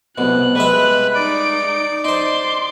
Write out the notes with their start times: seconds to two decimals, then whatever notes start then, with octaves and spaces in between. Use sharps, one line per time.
0.18 C2 B2 F#6
0.55 G3 G#3 B4 E5
1.15 D#4 D5 D7
2.05 D#4 C5 C6 D6